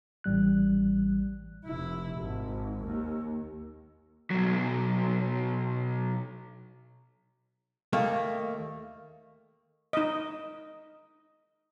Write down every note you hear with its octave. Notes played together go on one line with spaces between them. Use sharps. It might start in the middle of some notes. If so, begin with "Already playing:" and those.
A1 G3 F#6
F1 E4
G#1
D#2
B1 F#3
D#2 A3 A#3
D#4 D#5